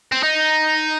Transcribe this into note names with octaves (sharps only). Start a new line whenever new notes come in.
C4
D#4